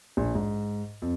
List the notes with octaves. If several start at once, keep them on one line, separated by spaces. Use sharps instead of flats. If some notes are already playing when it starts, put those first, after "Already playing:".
A#1
G#2
F2